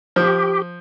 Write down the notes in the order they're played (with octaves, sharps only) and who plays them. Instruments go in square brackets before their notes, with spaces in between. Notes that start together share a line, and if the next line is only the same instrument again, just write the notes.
[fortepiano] F3 [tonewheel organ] G4